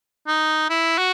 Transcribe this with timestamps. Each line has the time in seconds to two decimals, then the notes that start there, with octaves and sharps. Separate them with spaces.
0.28 D#4
0.70 E4
0.98 F#4